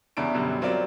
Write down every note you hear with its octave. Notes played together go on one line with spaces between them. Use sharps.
E2 C#3 D4 E4 D7
F#2 B2 D3 F#3 G3
F#3 C4 F4 G4 A#4 D5